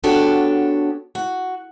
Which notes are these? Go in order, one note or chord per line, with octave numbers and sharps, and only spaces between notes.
B3 D4 F#4 G4 A4 C#5
F#4